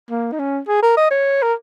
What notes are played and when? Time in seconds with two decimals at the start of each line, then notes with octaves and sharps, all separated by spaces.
0.11 A#3
0.32 D#4
0.39 C#4
0.68 G#4
0.83 A#4
0.97 D#5
1.11 C#5
1.42 A#4